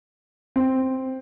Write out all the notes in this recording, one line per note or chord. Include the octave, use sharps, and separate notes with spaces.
C4